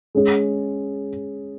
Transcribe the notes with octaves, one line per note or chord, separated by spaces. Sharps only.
G#3 C#4 G#4